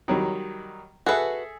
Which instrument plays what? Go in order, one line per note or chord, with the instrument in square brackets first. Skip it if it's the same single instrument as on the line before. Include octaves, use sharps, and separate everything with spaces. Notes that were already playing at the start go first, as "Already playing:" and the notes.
[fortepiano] D#3 F#3 G3
[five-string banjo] F#4 B4 [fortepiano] G#4 A4 E5